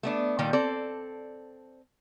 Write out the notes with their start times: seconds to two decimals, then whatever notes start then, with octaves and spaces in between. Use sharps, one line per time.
0.03 A3 B3 D4
0.39 A#2 D#3 G3 G4
0.53 C4 A4 D5